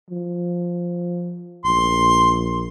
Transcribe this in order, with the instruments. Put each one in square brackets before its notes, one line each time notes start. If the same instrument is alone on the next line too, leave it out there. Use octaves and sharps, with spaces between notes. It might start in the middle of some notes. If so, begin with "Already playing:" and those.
[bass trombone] F3
[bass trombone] A#1 [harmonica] C6